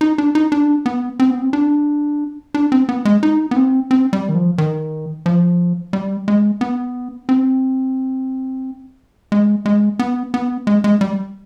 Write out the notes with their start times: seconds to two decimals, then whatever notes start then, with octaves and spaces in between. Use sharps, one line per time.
0.01 D#4
0.18 D4
0.35 D#4
0.52 D4
0.86 B3
1.20 C4
1.30 B3
1.42 C4
1.53 D4
2.54 D4
2.72 C4
2.89 B3
3.05 G#3
3.23 D#4
3.51 B3
3.56 C4
3.91 C4
4.13 G3
4.29 D#3
4.35 F3
4.58 D#3
5.26 F3
5.93 G3
6.28 G#3
6.61 B3
7.29 C4
9.32 G#3
9.66 G#3
9.99 B3
10.34 B3
10.67 G#3
10.84 G#3
11.01 G3